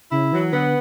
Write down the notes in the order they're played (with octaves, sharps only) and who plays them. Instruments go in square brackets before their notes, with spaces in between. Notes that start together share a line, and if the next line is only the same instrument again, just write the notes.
[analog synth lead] C#3 [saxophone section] E4
[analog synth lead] E3 [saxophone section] F#3
[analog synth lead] D3 [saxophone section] B3